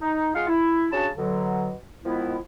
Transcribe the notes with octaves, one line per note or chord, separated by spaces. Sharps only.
D#4
G#3 F4 F5 F#5
E4
C#3 C#4 D4 F#4 A5
B2 D3 F#3
D#3 F3 G#3 B3 E4